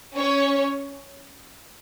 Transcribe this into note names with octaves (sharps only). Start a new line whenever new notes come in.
C#4 C#5